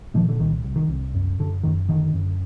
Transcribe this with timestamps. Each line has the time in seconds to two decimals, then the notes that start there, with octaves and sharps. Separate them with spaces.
0.14 A#2 D#3 F3
0.29 D3
0.39 C2 D#3
0.64 C2
0.76 D#3
0.88 C2
1.14 F#2
1.39 F#2 D3
1.63 F#2 D#3
1.89 D3 D#3
2.13 F#2